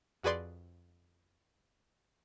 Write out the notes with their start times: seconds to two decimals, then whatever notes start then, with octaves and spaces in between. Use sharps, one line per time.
0.23 F2 F#4 G#4 B4 D5 C6